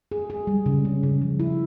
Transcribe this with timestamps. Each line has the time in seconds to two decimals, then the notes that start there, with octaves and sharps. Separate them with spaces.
0.12 G#4
0.30 G#4
0.47 G3
0.66 C#3
0.85 C#4
1.03 C#3
1.22 F3
1.40 E4